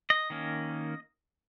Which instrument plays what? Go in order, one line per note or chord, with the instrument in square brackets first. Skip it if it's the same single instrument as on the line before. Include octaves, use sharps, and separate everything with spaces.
[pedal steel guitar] D#5
D#3 A#3 C#4